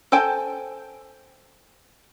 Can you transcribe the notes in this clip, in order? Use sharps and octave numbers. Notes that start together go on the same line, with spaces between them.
A4 C5 G5 G#5